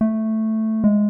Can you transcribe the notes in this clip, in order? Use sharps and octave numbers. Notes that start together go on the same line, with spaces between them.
A3
G#3